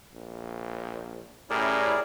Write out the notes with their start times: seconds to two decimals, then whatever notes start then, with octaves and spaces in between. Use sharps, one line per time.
0.13 A#1
1.50 A2 G3 C#4 E4 G#4 A#4 D5